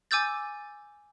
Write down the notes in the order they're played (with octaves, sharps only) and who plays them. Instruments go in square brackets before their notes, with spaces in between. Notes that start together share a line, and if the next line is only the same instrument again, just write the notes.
[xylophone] G#5 D6 E6 G6 A6